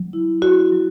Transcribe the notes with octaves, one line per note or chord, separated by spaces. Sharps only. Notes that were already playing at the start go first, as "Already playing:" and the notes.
Already playing: F#3
E4
E4 F#4
F#3